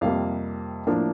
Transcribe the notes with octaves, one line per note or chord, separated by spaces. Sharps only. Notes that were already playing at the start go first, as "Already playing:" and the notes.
F2 C3 G3 A#3 F5
A2 F3 A#3 D4